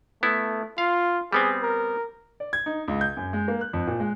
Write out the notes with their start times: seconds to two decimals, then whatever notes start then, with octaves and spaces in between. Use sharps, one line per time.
0.23 A3 B3 E4
0.78 F4 F5
1.33 G3 B3 C4 G#4
1.63 A#4
2.40 D5
2.53 G#6
2.66 D#4
2.88 C#2
3.01 G6
3.17 F#2
3.33 G#3
3.48 A#3
3.61 F#6
3.73 F2
3.87 A#2
4.00 G#3